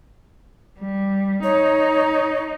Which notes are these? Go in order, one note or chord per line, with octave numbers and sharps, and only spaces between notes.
G3
D#4 C#5